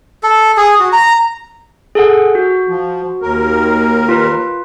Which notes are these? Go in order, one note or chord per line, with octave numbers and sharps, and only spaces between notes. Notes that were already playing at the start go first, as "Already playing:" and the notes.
A4
G#4
F#4
A#5
G#4 A4 F#5
F#4
F3
D#2 A#4
F4 B4